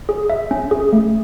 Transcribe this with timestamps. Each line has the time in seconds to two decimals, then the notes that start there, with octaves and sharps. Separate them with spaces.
0.09 G#4
0.30 E5
0.51 C#4
0.71 G#4
0.93 A3